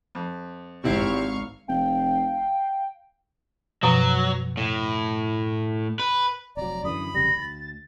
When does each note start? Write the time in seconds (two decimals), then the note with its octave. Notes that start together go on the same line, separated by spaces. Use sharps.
0.15 F2
0.84 G#1 C3 C4 E4 F5 C#6
1.68 F1 F5 G5
3.83 F#2 B2 F3 F#3
4.57 A2
5.99 B4
6.57 F1 F#3 D5 A#5
6.84 F#2 D3 E3 B5 D#6
7.14 F1 C#3 G3 A#6
7.36 D2 A6